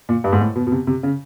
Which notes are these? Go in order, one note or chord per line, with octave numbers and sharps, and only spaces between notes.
A#2
G2
G#2
A2
B2
B2
C3
C3
C#3